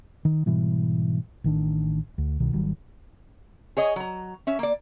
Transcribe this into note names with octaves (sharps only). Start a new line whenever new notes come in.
D#3
G#2 B2 E3 G3
A1 D#3 D4
D2
C2 B2 D#3
G#1 D#3 F#3 G3
G#4 C#5 D#5
F#3 A#5
C#4 E5
A#3 D5